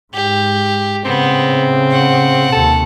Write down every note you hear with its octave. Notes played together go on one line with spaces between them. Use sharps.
G#2 G4
A2 C#3 B3 C4
F#5
D#2 C3 A4